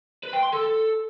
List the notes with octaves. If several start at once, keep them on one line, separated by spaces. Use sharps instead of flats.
B4
G5
C6
A4